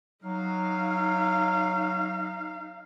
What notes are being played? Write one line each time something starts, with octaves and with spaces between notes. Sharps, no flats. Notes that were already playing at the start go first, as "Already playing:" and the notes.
F#3 D#4 F5